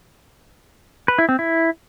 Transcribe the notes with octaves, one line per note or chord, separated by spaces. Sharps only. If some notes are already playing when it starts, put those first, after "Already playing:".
B4
E4
C4
E4